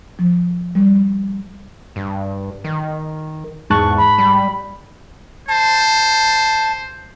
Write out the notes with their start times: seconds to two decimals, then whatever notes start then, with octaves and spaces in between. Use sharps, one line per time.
0.19 F3
0.75 G3
1.96 G2
2.64 D#3
3.70 E2 G#2 A5 C#6 F#6
3.97 B5
4.18 G3
5.48 C5 A5